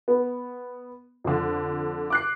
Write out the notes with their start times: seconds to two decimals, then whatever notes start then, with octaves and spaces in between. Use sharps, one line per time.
0.08 B3
1.24 F2 D3
2.10 D6 F#6 C7